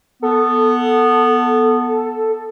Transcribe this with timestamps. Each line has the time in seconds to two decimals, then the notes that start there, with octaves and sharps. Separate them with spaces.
0.22 B3 A4